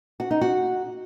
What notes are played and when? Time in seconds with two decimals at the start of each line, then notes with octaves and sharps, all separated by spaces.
0.20 F#4
0.31 D#4
0.41 F#4